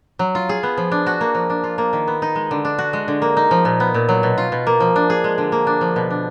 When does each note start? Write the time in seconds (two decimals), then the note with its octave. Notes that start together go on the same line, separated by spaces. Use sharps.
0.19 F#3
0.35 F4
0.49 G#4
0.63 B3
0.77 F3
0.92 D4
1.07 F#4
1.21 A#3
1.35 F3
1.50 D4
1.64 F4
1.78 A#3
1.93 D#3
2.07 B3
2.22 D#4
2.36 G#3
2.51 D3
2.65 D4
2.79 F#4
2.93 G#3
3.08 D3
3.22 A#3
3.37 D#4
3.51 F3
3.65 A#2
3.80 B3
3.94 A#2
4.09 F#3
4.23 B2
4.38 F4
4.52 B2
4.67 A#3
4.80 F3
4.96 D4
5.10 G#4
5.24 G#3
5.38 D3
5.52 A#3
5.67 D4
5.81 F3
5.96 B2
6.10 D4